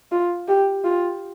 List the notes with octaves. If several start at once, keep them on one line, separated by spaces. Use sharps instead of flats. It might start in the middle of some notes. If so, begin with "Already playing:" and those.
F4
G4
F4